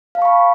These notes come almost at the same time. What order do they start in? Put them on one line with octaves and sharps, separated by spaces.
F5 A5 C#6 B5